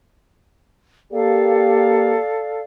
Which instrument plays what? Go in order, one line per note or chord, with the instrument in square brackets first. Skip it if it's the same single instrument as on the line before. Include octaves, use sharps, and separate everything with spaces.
[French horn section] A#3 G4 [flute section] A4 D5 F5